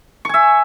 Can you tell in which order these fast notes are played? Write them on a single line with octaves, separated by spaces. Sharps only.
C#6 G#5 E5